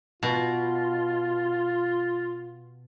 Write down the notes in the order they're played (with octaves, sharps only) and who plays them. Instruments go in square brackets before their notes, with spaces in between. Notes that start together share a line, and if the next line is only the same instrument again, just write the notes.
[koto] B2 [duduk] F4